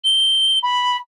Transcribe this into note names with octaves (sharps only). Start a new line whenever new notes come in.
G7
B5